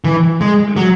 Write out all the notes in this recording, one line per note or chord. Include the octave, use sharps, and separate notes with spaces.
E3
G#3
F#3